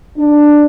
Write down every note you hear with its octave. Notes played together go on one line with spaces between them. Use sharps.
D4